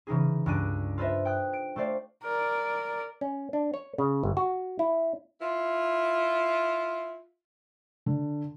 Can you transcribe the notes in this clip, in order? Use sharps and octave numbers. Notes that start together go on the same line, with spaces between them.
C#3 E3 D#4 G#4
C#2 G2 C#4 D4 F#6 D#7
F4 A4 B4 C5 D#5 E5
G5 D#6 F#6
D7
A3 A4 C5 D5 F5
A#4 D5
C#4
D4
C#5
C#3
G1
F#4
E4
E4 F4
D3